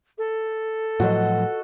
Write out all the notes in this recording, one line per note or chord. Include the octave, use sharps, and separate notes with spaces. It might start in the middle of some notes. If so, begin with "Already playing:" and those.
A4
A2 F3 F#3 F#4 D#5